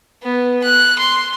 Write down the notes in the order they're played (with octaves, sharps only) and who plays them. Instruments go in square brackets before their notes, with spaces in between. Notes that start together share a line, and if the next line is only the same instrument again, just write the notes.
[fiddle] B3
F#6
C6